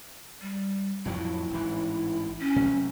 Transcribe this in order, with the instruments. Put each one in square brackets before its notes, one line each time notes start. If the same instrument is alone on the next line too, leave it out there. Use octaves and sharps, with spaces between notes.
[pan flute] G3
[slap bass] F2 A2 F#3 [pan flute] E4
[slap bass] A1 G#2 E3
[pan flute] C#4
[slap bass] C3 F#3 A3